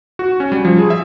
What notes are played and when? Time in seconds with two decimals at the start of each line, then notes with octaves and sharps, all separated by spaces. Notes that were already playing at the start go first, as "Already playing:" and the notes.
0.19 F#4
0.40 C#4
0.52 G3
0.65 F3
0.79 G#4
0.90 E5